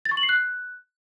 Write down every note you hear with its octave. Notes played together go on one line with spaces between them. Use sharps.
A6
C#6
F#7
C7
F#6